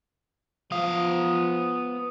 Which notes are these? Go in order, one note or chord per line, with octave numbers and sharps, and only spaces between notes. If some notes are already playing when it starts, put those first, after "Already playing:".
F3 B3 F5 D#6